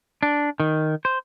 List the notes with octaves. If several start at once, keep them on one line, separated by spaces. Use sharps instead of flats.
D4
D#3
C5